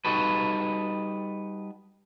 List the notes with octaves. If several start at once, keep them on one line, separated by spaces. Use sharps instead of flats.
G3 D#4 F#4 A4 B4